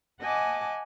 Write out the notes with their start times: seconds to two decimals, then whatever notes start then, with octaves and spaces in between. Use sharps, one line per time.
0.20 D#5 F#5 G#5 A5 D6